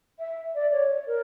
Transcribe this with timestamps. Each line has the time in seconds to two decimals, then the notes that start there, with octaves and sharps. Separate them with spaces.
0.19 E5
0.55 D5
0.72 C#5
1.07 A#4